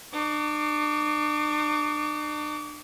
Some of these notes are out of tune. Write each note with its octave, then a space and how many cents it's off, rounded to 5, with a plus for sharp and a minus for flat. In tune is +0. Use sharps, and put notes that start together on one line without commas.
D4 +40 D6 -40